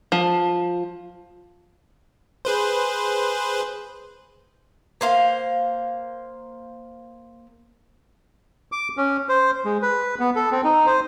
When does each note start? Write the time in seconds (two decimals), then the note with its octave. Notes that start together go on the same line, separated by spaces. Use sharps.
0.12 F3
2.45 G#4 B4 C5
5.01 A#3 C5 F5
8.72 D6
8.97 C#4
9.29 C5
9.65 G#3
9.82 B4
10.20 B3
10.36 A4
10.51 C4
10.64 D#4
10.86 C5